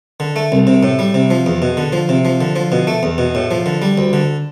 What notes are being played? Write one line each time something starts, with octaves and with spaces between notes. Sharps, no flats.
D3
A3
C2
C3
A2
G3
C3
F3
E2
B2
D3
F3
C3
F3
D3
F3
B2
A3
E2
B2
A2
F3
D3
G3
D2
D3